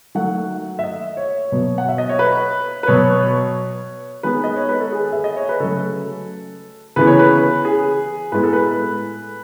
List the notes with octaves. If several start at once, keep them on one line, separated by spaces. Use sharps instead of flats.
D#3 F#3 A3 F#5
E5
D#5
C#5
B2 F#3 B3
F#5
E5
D#5
C#5
B4
B4
B2 F#3 B3 C#5
D#3 G#3 B3 B4
D#5
C#5
B4
A4
G#4
E5
D#5
C#5
B4
C#3 F#3 A3 A4
C#3 E3 B3 B4
C#5
B4
G#4
A2 G#3 B3 B4
A4
B4